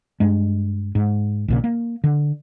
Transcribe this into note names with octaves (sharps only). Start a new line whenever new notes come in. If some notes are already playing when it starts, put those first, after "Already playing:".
G2 G#3
G#2
A#1 A#2 C#3
A#3
D3